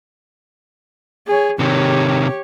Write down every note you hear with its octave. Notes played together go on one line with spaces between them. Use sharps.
G#4 C#5
C3 D#3 G4 C#5